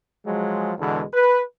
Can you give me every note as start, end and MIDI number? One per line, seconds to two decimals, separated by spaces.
0.25 0.72 53
0.25 0.72 54
0.25 0.72 56
0.79 1.02 40
0.79 1.02 47
0.79 1.02 50
0.79 1.02 52
0.79 1.02 56
1.12 1.41 71